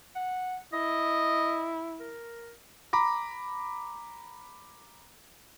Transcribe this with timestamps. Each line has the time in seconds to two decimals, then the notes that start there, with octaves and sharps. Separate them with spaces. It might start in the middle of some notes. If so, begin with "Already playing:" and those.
0.15 F#5
0.72 E4 D#5
2.00 A#4
2.93 A#5 B5 D6 A#6